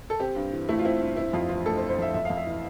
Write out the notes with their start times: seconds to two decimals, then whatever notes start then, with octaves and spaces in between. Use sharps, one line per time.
0.10 A4
0.20 C4 G4
0.36 G2
0.53 E3
0.69 A3 E4
0.79 F4
0.85 C4 E4
1.01 G2
1.17 C4 E4
1.33 F2 F4
1.49 E3 F4
1.66 A3 A4
1.77 C5
1.82 C4
1.89 C5
1.98 F2 E5
2.14 F2 E5
2.25 F2 F5
2.37 E5
2.46 E3